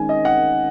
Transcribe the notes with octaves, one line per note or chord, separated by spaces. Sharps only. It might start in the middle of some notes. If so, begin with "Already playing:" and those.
Already playing: D#3 G#3 C#4 G#5
D#5
F#5